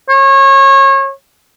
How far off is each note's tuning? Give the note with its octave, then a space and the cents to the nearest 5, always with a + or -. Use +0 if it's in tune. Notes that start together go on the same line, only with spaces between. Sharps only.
C#5 -30